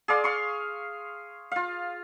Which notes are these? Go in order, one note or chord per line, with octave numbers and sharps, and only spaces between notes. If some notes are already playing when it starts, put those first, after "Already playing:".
G#4 D5 F5 C6
F5 C6 C#6
F4 F5